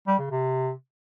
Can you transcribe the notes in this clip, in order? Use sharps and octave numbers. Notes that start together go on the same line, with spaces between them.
G3
C#3
C3